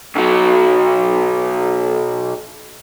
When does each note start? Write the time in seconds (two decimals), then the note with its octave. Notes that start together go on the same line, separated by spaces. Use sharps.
0.15 B1 F#3